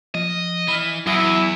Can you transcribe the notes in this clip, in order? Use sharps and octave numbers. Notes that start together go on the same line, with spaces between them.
F3 D#5
E3 B5 F6
E2 E3 F#3 E4 D#6 A#6